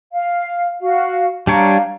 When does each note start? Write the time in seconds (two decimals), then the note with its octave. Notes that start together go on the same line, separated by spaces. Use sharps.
0.14 F5
0.81 F#4 F5
1.47 G3 D4 C#5 F5 A#5